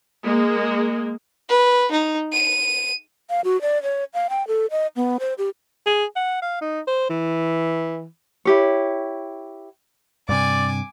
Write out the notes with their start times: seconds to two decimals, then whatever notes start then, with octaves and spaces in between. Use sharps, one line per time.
0.24 G#3 A#3
1.49 B4
1.91 D#4
2.32 D#7
3.30 F5
3.45 F#4
3.62 D5
3.83 C#5
4.14 F5
4.30 G5
4.48 A4
4.71 D#5
4.96 B3
5.20 C5
5.38 G4
5.87 G#4
6.16 F#5
6.42 F5
6.61 D#4
6.87 C5
7.09 E3
8.45 E4 G4 C#5
10.29 G2 C3 D5 G#5 D6